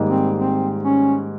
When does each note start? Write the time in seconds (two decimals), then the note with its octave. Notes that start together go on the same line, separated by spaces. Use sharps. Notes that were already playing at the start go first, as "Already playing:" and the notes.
Already playing: G#2 D#3 G3 A#3
0.09 C4
0.38 C4
0.83 C#4